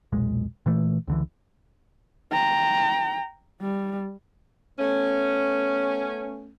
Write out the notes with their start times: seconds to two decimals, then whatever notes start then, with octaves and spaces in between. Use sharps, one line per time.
0.12 B1 E2 A#2 G#3
0.66 A#2 E3 A3
1.07 C#2 D3 E3
2.32 G5 A#5
3.61 G3
4.79 A3 B3 C#4